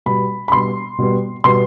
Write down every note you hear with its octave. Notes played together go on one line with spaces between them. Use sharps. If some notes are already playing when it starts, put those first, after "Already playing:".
B2 G3 B3 B5
B5
B2 G3 B3 C6
B2 G3 B3
B2 G3 B3 C6